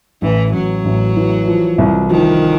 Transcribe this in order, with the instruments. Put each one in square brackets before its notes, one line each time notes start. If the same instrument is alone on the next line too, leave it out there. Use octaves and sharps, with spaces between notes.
[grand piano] A1 [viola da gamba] E3
[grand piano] A1 [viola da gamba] F#3
[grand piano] A1
E3
F3
C2
[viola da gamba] D#3 [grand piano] F3